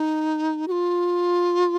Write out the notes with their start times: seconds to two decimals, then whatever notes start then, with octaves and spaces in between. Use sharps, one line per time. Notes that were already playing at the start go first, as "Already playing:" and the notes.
Already playing: D#4
0.68 F#4
0.71 F4